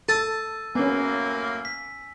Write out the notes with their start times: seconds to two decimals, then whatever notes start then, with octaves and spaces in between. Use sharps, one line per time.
0.09 A4 A5 E6 A6 D#7
0.75 F#2 A2 A#3 B3 C#4 G#5
1.65 B6